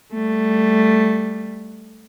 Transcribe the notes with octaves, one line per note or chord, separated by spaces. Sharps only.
G3 A3